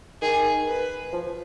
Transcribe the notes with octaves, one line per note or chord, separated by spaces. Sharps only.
D#3 G#4
B4
F3